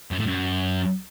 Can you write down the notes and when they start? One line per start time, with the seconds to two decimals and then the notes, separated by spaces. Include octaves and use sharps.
0.11 F#2
0.19 A2
0.26 F#2